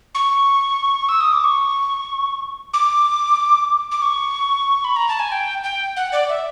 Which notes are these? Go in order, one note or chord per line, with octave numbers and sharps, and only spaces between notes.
C#6
E6
D#6
D6
C#6
D6
D6
C#6
B5
A#5
A5
G#5
G5
G5
F#5
D5
E5